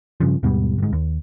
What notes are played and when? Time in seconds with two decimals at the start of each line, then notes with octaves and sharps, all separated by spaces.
0.20 G2 C#3 F3
0.43 D#2 G#2 B2 G3
0.78 G1 G#2
0.93 D#2